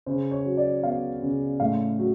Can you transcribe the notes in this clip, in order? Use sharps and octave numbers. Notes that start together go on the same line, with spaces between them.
C#3 C5
C#5
F#3
D5
B3 F5
C#3
A2 F5
F#3